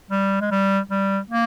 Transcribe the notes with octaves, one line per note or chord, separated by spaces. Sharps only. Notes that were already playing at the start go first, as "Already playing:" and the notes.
G3
G#3
G3
G3
A#3